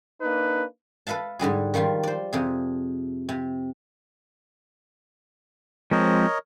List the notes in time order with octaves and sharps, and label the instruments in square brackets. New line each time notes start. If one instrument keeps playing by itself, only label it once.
[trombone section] A#3 D4 D#4 B4
[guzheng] A4 B4 E5 F5 A5
G#2 D3 G3 G#4
D#3 F3 G3 F4
C5 D5
F2 C3 G#4
C3
[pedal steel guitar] F3 G#3 C4 [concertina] A#4 C#5 D#5